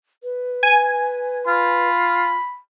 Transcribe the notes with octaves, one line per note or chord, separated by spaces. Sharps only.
B4
G#5
F4 B5